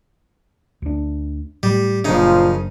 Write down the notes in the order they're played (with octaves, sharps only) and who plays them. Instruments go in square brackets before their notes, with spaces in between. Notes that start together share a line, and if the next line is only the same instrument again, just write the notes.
[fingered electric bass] D2 D4
[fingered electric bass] A2 [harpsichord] G3
[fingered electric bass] F#1 D4 [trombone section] A#2 F3 [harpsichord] C#3 D#4